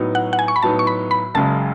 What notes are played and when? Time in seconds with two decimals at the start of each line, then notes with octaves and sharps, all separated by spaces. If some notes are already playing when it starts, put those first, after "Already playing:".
Already playing: A2 F#3 B3 D#4
0.15 F#5
0.33 F#5
0.39 G#5
0.48 C#6
0.56 B5
0.63 A2 F#3 B3 D#4 A5
0.79 C#6
0.87 B5
1.11 B5
1.35 F#1 F#2 C#3 G#3 A5